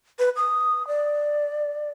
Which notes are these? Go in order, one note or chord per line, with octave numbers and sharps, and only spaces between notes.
B4
D#6
D5